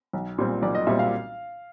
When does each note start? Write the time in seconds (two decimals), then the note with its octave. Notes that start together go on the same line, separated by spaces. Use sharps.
0.13 B1
0.38 A#2 G3 C4
0.62 B1 D5
0.75 D#5
0.87 A#2 G3 C4 E5
0.99 F5